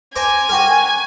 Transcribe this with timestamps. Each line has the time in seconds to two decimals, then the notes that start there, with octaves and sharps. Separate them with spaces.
0.16 C5 G#5 A#5 D6
0.49 F#4 G4 A#4